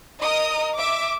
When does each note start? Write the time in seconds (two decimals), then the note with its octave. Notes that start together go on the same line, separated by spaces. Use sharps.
0.21 A#4 D#5 D#6
0.78 E5 D6